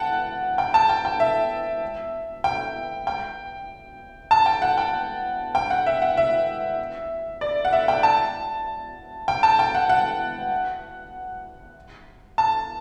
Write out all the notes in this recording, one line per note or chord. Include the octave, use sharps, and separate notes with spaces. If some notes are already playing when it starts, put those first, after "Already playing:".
Already playing: F#5 G5 A5
G5
A5
G5
G5
E5
G5
G5
A5
G5
F#5
G5
G5
F#5
E5
F#5
E5
D5
F#5
E5
G5
A5
G5
A5
G5
F#5
F#5
A5